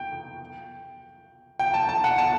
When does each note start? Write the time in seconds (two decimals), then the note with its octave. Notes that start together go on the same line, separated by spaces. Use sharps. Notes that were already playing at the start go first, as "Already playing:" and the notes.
Already playing: G5
1.59 G5
1.74 A5
1.89 A5
2.04 F#5
2.18 A5